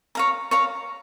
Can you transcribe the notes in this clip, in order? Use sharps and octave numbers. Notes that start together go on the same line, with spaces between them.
C#5 F5 A#5
C#5 F5 A#5